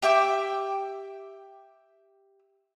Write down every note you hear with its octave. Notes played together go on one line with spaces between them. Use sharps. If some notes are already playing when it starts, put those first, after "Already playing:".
G4 E5 G5 D6